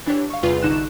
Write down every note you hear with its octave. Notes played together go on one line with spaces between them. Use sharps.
E3 D4 G4 C#5
F5 C#6
E2 C3 G3 F4 G#4 B4
A1 D3 D#4 C#6 F#6 E7